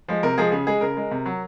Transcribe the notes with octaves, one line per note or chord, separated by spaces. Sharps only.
F3 G#3
C3 A#4
F3 G#3 G#4
C#3 G#4
G#3 G#4
C#3 A#4
G#3
C3
F#3